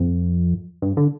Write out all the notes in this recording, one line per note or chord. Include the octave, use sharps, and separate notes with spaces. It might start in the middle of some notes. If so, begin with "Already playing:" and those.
Already playing: F2
G2
D3